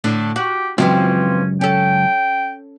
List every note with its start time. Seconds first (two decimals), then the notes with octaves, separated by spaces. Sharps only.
0.04 A2 D3 D4
0.36 F#4 G4
0.78 C#2 F#2 E3 F3 C4 C#4
1.61 C#4 A4 G5